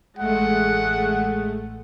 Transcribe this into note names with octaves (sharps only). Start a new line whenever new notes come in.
A1 G#3 A3 F#5